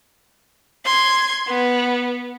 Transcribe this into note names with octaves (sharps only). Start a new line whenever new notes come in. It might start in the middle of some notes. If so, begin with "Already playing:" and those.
C6 G#6
B3